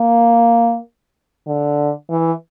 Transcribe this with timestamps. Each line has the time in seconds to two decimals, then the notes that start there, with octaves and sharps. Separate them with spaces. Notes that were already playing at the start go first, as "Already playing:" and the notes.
Already playing: A#3
1.47 D3
2.10 E3